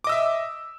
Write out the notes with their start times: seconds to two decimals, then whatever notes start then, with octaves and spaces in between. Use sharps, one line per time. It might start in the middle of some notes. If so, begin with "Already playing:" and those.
0.04 D6
0.07 D#5
0.09 E6
0.12 E5